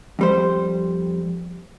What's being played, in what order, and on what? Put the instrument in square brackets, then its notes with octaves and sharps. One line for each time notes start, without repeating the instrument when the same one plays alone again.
[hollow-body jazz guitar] F2 G3 C5